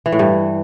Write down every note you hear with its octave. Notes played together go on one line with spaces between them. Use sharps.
E3
A2
G2